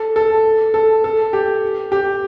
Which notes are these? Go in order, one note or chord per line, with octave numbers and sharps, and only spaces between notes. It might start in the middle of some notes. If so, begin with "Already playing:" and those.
Already playing: A4
A4
A4
A4
G4
G4